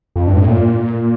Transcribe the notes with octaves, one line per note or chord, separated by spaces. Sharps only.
F2
G2
A2
A#2